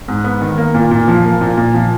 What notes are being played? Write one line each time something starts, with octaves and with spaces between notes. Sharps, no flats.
G#2
B3
D#3
A#3
A#2
A#2
F3
A#3
A#2
A#2
F3